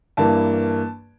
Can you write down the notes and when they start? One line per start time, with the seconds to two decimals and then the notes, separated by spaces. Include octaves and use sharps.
0.17 G2 E3 A#3 A5